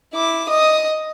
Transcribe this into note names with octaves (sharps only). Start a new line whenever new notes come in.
E4 D6
D#5 D#6